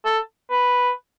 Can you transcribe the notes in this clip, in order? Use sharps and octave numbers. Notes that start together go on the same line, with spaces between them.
A4
B4